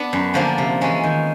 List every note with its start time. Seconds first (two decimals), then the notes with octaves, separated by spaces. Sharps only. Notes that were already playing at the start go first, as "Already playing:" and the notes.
Already playing: B3 D4
0.13 F#2
0.34 D3 F3 A#3 D4
0.58 C3
0.81 E3 G#3 C#4
1.04 D#3